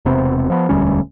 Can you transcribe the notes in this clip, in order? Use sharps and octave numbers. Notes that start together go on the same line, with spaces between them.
E1 C3 B3 C4
F3 B3
E1 D2 G3 C#4